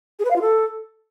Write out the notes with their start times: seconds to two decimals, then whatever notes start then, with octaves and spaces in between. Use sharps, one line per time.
0.19 G#4
0.25 B4
0.30 F5
0.36 F4
0.41 A4